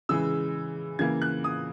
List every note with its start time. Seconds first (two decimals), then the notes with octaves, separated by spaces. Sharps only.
0.09 C#3 E3 G#3 E6
0.99 C#3 E3 A#3 G#6
1.22 F#6
1.44 D#6